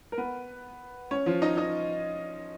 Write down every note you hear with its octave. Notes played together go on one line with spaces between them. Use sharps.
A#4
B3 B4
C#4 C#5
F3 F4
D#4 D#5
D#4 D#5